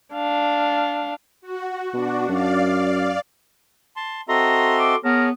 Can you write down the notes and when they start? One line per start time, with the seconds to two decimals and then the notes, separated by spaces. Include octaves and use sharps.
0.14 D4 F5
1.41 F#4
1.94 B2 D4 F#4
2.28 F#2 D5 F5
3.96 A5 C6
4.29 C4 F#4 A4 D#5 E5 A#5 C6
4.79 D6
5.05 B3 G#4 A#4 C#5 A5